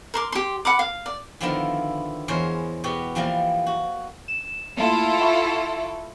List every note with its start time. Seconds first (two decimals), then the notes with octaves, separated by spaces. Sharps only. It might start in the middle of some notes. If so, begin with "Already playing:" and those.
0.14 A#4 C6 D6
0.32 G4 C6
0.65 F#5 B5 D6
0.79 F5
1.06 D5
1.41 D3 D#3 F3 B3 E4 A#4
2.28 E2 G#3 A#4 C5 C#5
2.84 B2 B3 F#4 G4
3.15 E3 F3 G3 A#3 A#4
3.66 F#4
4.28 E7
4.77 A3 A#3 E4 F4 A4
5.21 E5 F#5 C#6